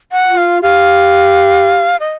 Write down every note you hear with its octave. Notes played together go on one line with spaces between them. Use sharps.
F#5
F4
F5
G4 F5
D#5